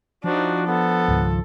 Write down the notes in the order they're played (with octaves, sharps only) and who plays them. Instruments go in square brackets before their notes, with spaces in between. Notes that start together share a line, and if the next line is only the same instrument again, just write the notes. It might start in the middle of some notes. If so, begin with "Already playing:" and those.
[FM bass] F3 [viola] D4 D#4 [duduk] F#4
[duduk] B3 [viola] A4
[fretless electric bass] C#2 G#2 D#3